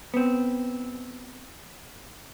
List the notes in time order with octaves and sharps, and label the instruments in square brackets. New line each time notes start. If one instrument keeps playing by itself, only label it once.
[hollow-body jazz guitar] B3 C4